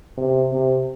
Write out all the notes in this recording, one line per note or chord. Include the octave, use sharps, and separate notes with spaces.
C3
C3